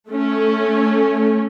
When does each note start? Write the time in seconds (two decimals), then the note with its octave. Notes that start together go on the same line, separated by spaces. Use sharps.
0.10 A3 C#4